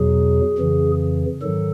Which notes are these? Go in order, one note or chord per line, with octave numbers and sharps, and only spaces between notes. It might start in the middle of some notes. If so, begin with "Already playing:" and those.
Already playing: E2 B2 F#3 G#4
F2 C#3 E3
G#2 D#3 F#3 A4